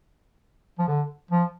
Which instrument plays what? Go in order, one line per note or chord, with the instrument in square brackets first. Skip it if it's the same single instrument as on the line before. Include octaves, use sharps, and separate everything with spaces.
[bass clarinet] F3
D3
F3